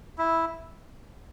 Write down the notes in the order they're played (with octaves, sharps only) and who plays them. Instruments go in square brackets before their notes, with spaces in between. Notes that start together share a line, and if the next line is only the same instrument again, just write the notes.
[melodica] E4